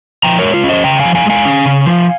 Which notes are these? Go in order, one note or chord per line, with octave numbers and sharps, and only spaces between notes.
F3 G5 A#5
G#3 A#4 C#5
F4
C#4
C5 D#5
C#3 G5 A#5
F5 G#5
F3
F5 G#5
G#3 F5 G#5
C#4
C#3
F3